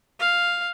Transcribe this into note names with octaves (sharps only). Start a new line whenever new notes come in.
F5